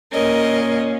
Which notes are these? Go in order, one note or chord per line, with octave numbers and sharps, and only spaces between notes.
A#2 A#3 C#4 A#4 D#5